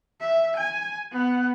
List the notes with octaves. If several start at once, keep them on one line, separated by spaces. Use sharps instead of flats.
E5
G#5
B3 F#5